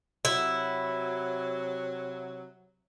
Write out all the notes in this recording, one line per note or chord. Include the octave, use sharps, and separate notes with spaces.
C3 F#3 E4